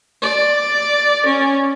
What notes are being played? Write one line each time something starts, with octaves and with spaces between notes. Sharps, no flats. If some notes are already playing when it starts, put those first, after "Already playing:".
D5
C#4